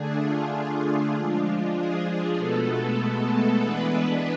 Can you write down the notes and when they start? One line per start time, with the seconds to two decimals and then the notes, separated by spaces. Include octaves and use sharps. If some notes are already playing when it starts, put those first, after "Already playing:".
Already playing: D3 A3 D4 G#4
0.22 F4
1.13 F3 G#3 D4 F4
1.75 G#4
2.06 G#4
2.36 B2 G#3 A3 B3 A4
3.59 E3 G#3 B3 D4 B4